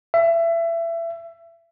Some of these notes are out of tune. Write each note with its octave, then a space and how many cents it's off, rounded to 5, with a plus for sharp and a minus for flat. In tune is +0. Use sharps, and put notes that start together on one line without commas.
E5 +25